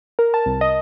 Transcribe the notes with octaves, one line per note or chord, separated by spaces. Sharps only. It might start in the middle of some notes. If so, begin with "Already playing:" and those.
A#4
A5
C2
D#5